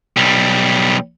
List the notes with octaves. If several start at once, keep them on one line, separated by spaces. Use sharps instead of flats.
B1 G3